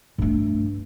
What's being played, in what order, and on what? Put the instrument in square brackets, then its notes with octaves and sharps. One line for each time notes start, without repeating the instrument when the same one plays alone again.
[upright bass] G2 A3